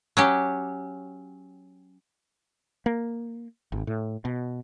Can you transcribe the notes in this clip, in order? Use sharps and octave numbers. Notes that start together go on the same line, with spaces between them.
F#3 C#4 G4
A#3
G#1
A2
B2